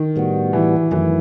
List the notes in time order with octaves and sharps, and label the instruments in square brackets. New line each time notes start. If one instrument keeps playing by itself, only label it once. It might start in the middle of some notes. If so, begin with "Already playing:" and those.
Already playing: [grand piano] D#3
[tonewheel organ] A2 G3 B3 F#4
[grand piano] E3
[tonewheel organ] F#2 D#3 F#3 A3 [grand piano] E3